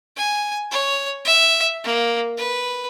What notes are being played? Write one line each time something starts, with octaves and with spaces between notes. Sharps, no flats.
G#5
C#5
E5
A#3
B4